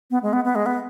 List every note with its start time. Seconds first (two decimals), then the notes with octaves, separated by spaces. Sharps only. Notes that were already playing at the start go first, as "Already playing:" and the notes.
0.11 B3
0.23 G#3
0.33 B3
0.45 B3
0.55 G#3
0.66 B3